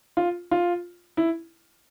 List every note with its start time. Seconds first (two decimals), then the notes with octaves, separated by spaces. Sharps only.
0.17 F4
0.51 F4
1.17 E4